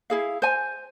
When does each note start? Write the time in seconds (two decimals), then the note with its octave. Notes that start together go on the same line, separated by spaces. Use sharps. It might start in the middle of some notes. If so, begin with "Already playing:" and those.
0.10 E4 G#4 F5
0.42 C5 G#5